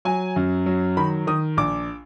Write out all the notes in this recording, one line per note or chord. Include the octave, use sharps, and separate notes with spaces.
F#3 G#5
F#2
F#3
D#3 B5
D#3 D#6
A#1 D6